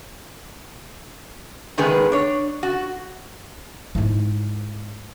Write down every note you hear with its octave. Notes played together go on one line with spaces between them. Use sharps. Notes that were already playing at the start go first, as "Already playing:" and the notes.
C3 D#3 G#3 B3 G#4 B4
D4 C#5
F#4
G#2 E4